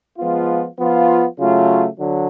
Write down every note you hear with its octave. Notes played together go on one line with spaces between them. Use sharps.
F3 G#3 B3 F4
F3 B3 F4
C#3 F#3 A3 F4
D3 F#3